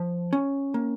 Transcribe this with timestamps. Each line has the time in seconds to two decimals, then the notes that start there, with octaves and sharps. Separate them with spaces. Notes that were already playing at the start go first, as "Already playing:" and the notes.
Already playing: F3
0.33 C#4
0.74 A#3